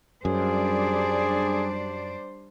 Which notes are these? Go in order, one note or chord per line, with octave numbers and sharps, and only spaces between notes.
F#2 G3 D4 G#4 C5 D5